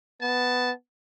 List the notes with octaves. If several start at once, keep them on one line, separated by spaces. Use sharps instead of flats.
B3 A5